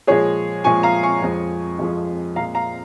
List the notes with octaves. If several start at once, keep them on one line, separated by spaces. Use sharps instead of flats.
A#2 F3 G#3 G#4 C#5
A#2 F3 G#3 G#5 C#6
F5 A#5
G#5 C#6
F2 F3 G#3
F2 F3 G#3
A#2 G#3 F5 A#5
F5 A#5